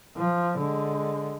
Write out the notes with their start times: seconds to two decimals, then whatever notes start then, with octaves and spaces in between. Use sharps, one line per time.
0.16 F3
0.58 D3 G#3